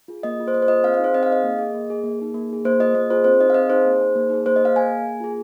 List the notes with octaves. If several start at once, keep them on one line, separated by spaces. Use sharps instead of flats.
F4 G#4
A#3 D#5
F4 G#4
C5
A#3 D#5
C5
F4 G#4 D#5
C4 F5
F5
D#4 G#4 C5
C4 D#5
F5
D#4 G#4 D#5
A#3
G#4
A#3
G#4
A#3
D#4 G#4
A#3
D#4 G#4
A#3 C5
F4 G#4 D#5
A#3 D#5
F4 G#4 C5
C4 C5
D#4 G#4 D#5
F5
C4 D#5
D#4 G#4 C5
A#3
D#4 G#4
A#3
D#4 G#4
A#3 C5
D#5
G#4 F5
A#3 G#5
G#4
A#3
F4 G#4